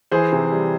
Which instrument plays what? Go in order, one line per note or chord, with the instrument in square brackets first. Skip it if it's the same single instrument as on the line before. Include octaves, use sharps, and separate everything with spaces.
[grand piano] E3 G#4 C5
C3
G3